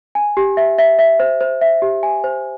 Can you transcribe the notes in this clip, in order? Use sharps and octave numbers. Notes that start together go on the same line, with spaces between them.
G#5
G4
E5
E5
E5
C5
C5
E5
G4
G#5
C5